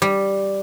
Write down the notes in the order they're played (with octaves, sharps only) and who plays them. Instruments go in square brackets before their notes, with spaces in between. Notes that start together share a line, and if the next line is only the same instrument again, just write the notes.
[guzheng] G3